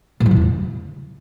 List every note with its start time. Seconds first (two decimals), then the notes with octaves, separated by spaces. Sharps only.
0.20 A2
0.26 F#3
0.31 D#3
0.36 E2
0.42 C#3